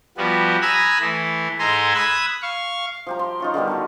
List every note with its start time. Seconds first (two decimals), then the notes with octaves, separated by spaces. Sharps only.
0.17 F3 G3 B3 F#4
0.62 G#5 A#5 B5 D#6 E6 F#6
1.01 E3 A3
1.59 G#2 A4 G#5 A#5 C6
1.94 B5 D#6 E6 F#6 G#6
2.42 F5 C#6
3.07 F3 G4 A#5
3.19 C6
3.40 D#4 F4 C#5
3.54 D3 D#3 G3 B3
3.67 D#4 F#4 A5